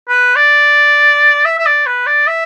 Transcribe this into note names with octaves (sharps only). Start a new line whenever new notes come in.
B4
D5
E5
E5
D5
B4
D5
E5